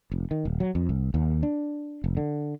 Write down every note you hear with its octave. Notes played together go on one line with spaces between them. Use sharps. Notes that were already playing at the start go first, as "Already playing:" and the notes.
F1
D#3
D#1
F#3
F2
C2
D#2
D4
F1
D3